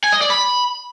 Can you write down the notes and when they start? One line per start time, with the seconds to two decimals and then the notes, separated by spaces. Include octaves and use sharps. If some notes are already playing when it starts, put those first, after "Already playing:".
0.04 G#5
0.13 D#5
0.21 D5
0.30 B5